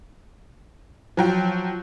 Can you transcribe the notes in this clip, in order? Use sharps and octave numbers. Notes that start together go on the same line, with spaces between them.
F3 F#3 G5